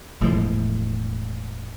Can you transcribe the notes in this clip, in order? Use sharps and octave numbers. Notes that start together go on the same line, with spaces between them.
E1 A2 F3 G#3